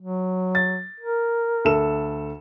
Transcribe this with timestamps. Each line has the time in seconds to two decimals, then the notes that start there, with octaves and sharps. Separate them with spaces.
0.01 F#3
0.55 A6
1.00 A#4
1.65 D2 A4 E7